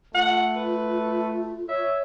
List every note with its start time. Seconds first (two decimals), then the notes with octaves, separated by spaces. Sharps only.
0.14 A3 F4 F#5
0.56 B4
1.69 C#5 E5